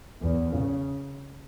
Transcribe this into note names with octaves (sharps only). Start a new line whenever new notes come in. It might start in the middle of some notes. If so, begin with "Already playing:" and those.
E2
C#3